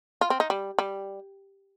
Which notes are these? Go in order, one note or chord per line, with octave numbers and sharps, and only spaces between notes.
F4
C4
D#4
G3
G3